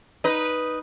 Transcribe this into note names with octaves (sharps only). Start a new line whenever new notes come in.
D#4 B4